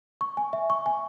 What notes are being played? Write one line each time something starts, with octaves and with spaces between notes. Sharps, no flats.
C#6
G#5
E5
C#6
G#5